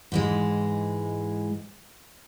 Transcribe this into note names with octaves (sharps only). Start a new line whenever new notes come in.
G#2 E3 G#3